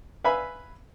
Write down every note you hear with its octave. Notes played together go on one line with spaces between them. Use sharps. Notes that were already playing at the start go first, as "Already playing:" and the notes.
B4 E5 F5 G#5 B5